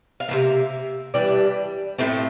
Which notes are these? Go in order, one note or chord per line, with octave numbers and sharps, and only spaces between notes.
F5
C3 E3 A#3 E5
E3 G3 D4
A2 F3 A3 C4